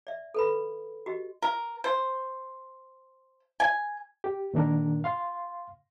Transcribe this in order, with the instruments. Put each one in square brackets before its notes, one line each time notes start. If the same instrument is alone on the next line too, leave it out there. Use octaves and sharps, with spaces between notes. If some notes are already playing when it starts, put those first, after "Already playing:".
[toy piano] D5 E5
A4 B4 B5
F#4 G4 D#5
[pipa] A#4
C5
G#5
[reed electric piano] G4
A#2 D#3 D4 A#4
F5 C6